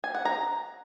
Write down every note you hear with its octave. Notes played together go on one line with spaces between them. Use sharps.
G#5
F#5
A#5